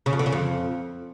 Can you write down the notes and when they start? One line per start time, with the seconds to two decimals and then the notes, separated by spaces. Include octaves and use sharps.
0.06 C#3
0.13 F2
0.19 D3
0.26 C#3
0.32 F2